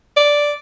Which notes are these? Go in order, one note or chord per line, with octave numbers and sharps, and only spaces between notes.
D5